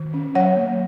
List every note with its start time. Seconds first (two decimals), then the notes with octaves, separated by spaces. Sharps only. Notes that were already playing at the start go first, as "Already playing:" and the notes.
Already playing: D#3
0.14 C#4
0.35 F#3 C#5 F#5
0.56 A#3